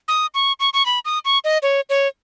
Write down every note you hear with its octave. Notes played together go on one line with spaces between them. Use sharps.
D#6
C#6
C#6
C#6
B5
D#6
C#6
D#5
C#5
C#5